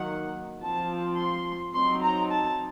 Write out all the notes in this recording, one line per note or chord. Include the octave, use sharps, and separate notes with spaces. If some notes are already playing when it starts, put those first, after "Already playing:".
Already playing: D#3 F#3 A#3 F#5
F3 C4 F4 A5
C6
F#3 C4 D#4 C6
A#5
A5